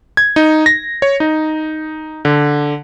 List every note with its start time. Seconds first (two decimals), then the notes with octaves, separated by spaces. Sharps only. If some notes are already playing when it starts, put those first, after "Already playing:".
0.17 G#6
0.36 D#4
0.66 A#6
1.02 C#5
1.20 D#4
2.25 D3